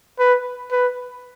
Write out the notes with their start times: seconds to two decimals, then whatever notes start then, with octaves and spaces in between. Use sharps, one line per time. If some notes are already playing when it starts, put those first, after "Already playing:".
0.19 B4
0.71 B4